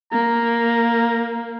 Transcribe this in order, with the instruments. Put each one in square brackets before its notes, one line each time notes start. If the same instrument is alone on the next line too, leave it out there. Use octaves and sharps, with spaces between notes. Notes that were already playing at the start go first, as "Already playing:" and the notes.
[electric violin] A#3 [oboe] A#5